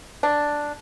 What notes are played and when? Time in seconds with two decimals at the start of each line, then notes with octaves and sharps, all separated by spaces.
0.23 D4